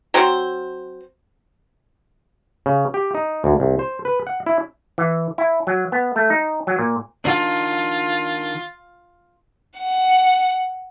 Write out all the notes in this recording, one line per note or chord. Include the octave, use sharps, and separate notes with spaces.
F#3 C4 C5
C#3
G4
D#4
D2
C2
C5
B4
F#5
E4
E3
E4
F#3
B3
A3
D#4
F#3
A#2
D#3 D4 F4
F#5